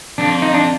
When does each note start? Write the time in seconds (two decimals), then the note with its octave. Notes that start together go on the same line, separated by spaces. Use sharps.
0.18 F2 D4
0.42 D#4
0.54 D4